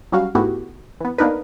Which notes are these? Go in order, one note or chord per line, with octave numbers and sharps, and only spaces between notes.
F#3 G3 C#4 F#4 F5
G#2 A3 B3 E4 F#4 G4
E3 B3
A#3 B3 D4 D#4 A#4 B4